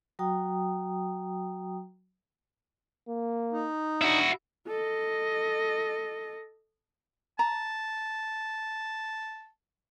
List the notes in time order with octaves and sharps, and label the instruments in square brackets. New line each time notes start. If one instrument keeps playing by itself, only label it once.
[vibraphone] F#3 F#4 G5 A#5 D#6
[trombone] A#3
[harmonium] D#4
[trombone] D4 [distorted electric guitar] E4 F#4
[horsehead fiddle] A4 D#5
[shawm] A5 [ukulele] A#5